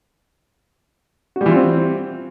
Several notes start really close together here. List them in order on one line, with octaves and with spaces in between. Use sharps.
F#4 G3 E3 F4 C4